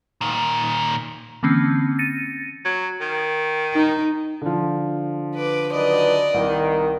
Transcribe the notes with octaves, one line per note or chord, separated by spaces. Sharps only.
A#2 D#3
D3 E3 A#3 C4 C#4
A6 A#6 C#7 D#7
F#3
D#3
D#4
D3 F3
B4 D6
D#3 F#3 B4 D5 D#5
C2 D#3